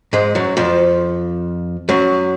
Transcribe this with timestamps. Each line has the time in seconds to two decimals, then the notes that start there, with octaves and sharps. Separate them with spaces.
0.13 G#2 G#3
0.35 F#2 F#3
0.57 F2 F3
1.89 F#2 F#3